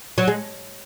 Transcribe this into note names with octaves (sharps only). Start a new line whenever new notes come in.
F#3
G#3